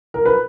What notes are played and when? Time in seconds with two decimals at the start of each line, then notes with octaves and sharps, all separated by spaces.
0.14 A#4
0.26 B4